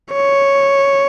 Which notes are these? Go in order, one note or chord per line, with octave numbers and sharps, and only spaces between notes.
C#5